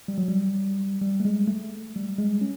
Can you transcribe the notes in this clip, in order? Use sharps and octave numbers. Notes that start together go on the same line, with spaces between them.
G3
F#3
G3
G3
A3
G#3
A3
G3
G#3
C#4